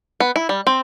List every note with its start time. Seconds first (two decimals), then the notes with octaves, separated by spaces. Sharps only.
0.20 B3
0.36 E4
0.49 G3
0.67 C4